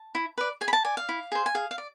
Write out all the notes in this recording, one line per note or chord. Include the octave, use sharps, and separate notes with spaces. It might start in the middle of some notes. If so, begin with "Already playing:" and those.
Already playing: A5
E4
B4 D5
G#4 G#5
B5
A5
D5 G#5
F5
E4
G#4 C5
G#5
G#4 F5
F5
D5